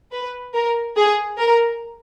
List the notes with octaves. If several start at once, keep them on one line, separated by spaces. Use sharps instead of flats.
B4
A#4
G#4
A#4